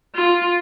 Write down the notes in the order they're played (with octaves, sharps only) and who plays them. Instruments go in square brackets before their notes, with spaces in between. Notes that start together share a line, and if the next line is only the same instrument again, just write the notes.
[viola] F4